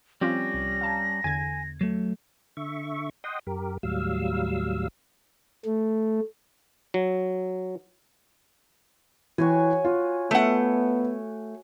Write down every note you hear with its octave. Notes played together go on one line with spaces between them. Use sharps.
F3 G3 C4 C#4 F4 G4 A#6
C2
F5 A5 A#5
E2 D3 G#5 G#6
F#3 A3
D3 E5 C#6
D#5 F#5 G5 C6 D#6
F#2 G4 A#4
D#2 A2 F#3 G3 F5 E6
A3
F#3
E3 F#4 C#5 G#5
F4
A3 B3 F#5